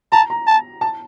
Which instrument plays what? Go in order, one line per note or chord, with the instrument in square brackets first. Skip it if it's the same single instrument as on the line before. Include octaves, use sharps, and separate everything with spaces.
[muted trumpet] A5 [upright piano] A#5
[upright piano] A#5
[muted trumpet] A5
[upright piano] A5